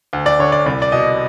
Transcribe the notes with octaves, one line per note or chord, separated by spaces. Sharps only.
D2
D5
D3 C#5
D5
C2 D5
D5
B2 D#5